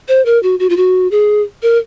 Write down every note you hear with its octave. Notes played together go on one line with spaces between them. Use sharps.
C5
A#4
F#4
F#4
F4
F#4
G#4
A#4